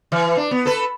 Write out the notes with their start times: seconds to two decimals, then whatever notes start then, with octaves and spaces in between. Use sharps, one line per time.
0.12 E3
0.37 D4
0.51 B3
0.66 A4 B4